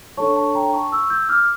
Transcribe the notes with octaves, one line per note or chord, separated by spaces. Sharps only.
D4 A4 C#5 A5 C#6
A5 C#6
G5 A#5
A5 C#6
C#6 E6
E6 G6
D6 F6